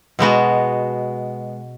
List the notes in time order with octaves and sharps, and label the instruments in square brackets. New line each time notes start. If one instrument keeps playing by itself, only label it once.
[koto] B2 G#3 B3 F#4